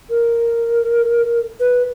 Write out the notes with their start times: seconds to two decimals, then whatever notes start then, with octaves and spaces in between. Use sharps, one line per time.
0.10 A#4
1.60 B4